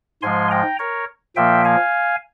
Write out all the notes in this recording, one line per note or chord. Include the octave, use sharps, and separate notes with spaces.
G#2 F3 G#3 G#5 C6
G5 A#5
A#4 C#5
A#2 F3 A#3 E5 G5
F5 G#5